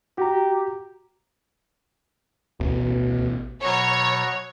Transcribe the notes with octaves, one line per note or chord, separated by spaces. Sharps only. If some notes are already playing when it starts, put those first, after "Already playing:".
F#4 G4 A#5
A1 D2 B2
B2 F#3 C#5 A#5